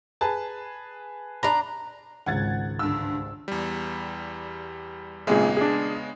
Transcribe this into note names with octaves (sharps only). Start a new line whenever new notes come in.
G#4 B4 A5
D4 A#5 B5
G#1 C#2 F#5 G#6 A6
G2 D3 E6
E2 G3
G#1 A#2 C#3 G#3 B3 G#4
D4 G#4